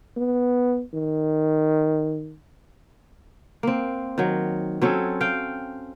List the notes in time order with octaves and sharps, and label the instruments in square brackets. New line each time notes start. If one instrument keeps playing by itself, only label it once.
[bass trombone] B3
D#3
[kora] A#3 C4
D#3 F#3
F#3 C4 C#4 A4
F5 G5